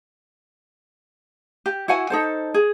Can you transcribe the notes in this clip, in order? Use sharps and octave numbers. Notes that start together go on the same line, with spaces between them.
G4
E4 F#4 F#5 G#5
D#4 A4 C5
G#4